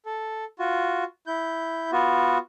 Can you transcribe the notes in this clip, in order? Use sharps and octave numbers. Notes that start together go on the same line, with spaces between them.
A4
F4 F#4
E4 G6
B3 F4 F#4